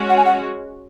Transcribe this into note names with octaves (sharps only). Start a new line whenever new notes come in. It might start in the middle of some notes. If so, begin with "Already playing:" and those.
Already playing: G#3 C#4 F#4 C#5
F#5
G#5
F#5